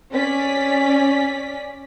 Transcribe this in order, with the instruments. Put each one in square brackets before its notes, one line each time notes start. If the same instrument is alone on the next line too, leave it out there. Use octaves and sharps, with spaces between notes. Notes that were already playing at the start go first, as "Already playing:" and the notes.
[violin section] C#4 D5 B6